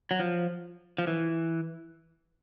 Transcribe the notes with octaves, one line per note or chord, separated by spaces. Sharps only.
F#3
F3
F3
E3